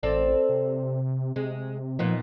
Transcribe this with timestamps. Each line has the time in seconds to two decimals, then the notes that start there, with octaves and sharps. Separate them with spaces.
0.03 A1 C4 A4 D5
0.49 C3
1.36 C3 G#3
1.99 A#2 F3 B3 D#4